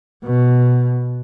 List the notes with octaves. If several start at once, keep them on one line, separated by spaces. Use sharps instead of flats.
B2